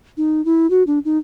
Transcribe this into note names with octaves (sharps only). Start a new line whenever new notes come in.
D#4
E4
F#4
D4
D#4